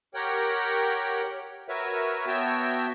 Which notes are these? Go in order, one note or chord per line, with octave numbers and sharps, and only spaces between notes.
G4 A#4 C#5 F#5 G5
F#4 A#4 B4 C#5 E5
B3 F#4 C#5 E5 G5 A5